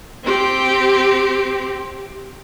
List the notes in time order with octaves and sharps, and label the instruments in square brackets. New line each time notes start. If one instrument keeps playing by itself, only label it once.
[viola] C4 G4